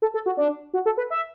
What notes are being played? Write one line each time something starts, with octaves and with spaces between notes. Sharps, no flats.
A4
A4
F#4
D4
F#4
A4
B4
E5